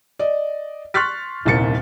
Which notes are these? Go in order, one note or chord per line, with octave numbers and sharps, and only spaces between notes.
D5 D#5
C6 C#6 F6 F#6 A6 B6
D#1 C2 A#2 A6 C#7